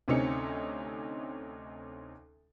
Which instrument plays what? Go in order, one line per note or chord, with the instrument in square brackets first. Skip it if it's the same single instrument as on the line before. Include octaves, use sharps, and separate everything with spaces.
[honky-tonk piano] D2 C3 C4 C#4 D#4 C#7